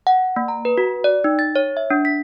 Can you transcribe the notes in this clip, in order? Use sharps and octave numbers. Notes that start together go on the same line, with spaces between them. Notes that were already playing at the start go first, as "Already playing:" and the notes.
F#5
A#3
A#5
B4
F#4
D5
D#4
A6
C#5
E5
D4
B6